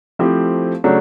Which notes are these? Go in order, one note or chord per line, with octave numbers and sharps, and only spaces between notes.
F3 A3 C4 E4 G4
C#3 F#3 A3 D4